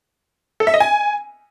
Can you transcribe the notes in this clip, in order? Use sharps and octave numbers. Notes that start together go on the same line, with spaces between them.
A4
E5
D#5
G#5